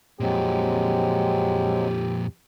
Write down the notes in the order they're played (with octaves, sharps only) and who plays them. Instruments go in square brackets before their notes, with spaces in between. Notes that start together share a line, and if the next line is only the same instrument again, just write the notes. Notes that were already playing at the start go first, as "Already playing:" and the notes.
[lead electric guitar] F2 A#2 [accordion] F#3 G#3 C4 [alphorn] G4